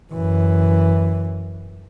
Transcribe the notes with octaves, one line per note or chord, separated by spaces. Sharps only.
F#2 E3